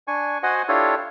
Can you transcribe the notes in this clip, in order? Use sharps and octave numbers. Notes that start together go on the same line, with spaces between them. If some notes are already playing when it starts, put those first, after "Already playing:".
D4 G#5 C#6
F#4 C5 D#5 F#5 G#5
D4 E4 F4 G4 A4 C#5